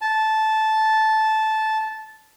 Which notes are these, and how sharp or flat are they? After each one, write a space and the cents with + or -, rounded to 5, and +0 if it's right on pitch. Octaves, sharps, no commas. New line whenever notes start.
A5 -10